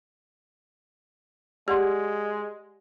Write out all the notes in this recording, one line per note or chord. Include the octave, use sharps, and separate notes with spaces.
G#3 G4 D5 F#5 C6